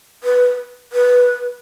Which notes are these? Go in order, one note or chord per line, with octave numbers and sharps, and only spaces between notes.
B4
B4